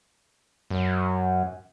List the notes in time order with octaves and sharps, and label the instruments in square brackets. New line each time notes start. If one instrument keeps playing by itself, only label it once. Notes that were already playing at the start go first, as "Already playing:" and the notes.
[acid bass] F#2